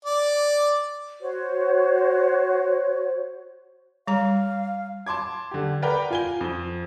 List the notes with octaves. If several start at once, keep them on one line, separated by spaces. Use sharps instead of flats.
D5
F#4 C5 C#5
G3 F5 A#5
A5 C6 D6 G#6
D3 G4
A#4 B4 D5 F#5 G5 A#5
F4 G#5 G7
F2